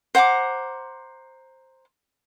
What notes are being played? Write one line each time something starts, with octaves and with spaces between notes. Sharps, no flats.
C5 F#5 A#5 D6